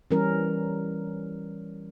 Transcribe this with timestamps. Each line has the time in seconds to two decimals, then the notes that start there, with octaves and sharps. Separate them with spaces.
0.11 E3 G3 C#4 A#4